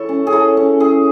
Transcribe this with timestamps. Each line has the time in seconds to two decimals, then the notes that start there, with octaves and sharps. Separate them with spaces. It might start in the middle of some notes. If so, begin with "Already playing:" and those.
Already playing: E3 A4 C#5
0.09 C#4
0.27 G#4
0.33 E3 A4
0.57 C#4
0.80 E3 G#4